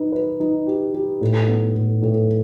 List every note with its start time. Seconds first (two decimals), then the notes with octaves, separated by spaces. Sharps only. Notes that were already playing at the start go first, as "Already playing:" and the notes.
Already playing: D#4 B4
0.12 B4
0.40 D#4
0.67 G4
0.94 G4
1.21 A2
1.48 B3
1.75 A2
2.02 A2